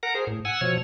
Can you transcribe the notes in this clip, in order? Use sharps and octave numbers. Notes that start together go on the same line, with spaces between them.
A#4 F#5 A#5
G#4 C5
A2
F#5 G#5 E6
B2 F3 C#5